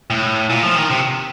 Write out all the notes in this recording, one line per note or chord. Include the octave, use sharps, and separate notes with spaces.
A2
A#2
F3
D#3
C3